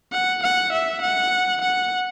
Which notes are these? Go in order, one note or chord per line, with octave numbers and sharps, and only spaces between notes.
F#5
F#5
E5
F#5
F#5